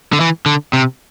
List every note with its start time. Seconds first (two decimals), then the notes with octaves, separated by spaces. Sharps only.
0.13 D3
0.20 E3
0.46 D3
0.73 C3